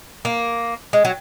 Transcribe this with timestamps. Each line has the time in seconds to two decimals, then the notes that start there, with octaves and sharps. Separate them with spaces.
0.25 A#3
0.93 G#3
1.05 F#3